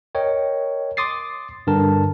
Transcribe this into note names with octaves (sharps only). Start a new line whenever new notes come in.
A#4 C#5 D#5 G5
C6 D6 D#6 A6 C7
G2 D3 A#4 A5